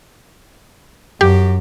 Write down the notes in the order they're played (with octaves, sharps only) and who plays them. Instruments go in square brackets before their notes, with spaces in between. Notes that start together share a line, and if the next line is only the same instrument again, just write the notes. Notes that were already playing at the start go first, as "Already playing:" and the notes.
[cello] F#2 [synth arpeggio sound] G4